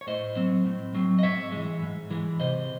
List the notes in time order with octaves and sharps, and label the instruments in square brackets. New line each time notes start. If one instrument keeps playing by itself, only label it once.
[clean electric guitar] C#5
A2 C5 D#5
F#3 C4
A2
F#3 C4
D#5
G#2 C#5 E5
E3 G#3
G#2
E3 G#3
C3 C5 D#5